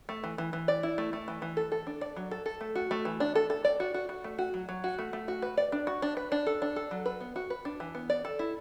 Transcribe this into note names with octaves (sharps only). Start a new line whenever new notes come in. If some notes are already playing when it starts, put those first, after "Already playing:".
A3
E3
E3
E3
D5
E4
A3
A3
E3
E3
A4
A4
D4
D5
F#3
A4
A4
A3
F#4
A3
E3
D4
A4
A4
D5
F#4
F#4
F#4
A3
F#4
F#3
F#3
F#4
A3
A3
F#4
B4
D5
D4
F#4
D4
B4
D4
A4
D4
A4
F#3
B4
B3
F#4
B4
D4
E3
B3
D5
A4
E4